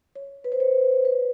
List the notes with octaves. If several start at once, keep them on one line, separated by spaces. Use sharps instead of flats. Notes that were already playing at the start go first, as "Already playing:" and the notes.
C#5
B4
C5
C#5
B4